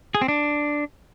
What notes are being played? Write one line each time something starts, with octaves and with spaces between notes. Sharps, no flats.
G#4
C4
D4